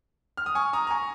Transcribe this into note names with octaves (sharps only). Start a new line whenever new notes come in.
F6
D#6
G#5 C#6
A#5 D#6
A#5
G#5 C#6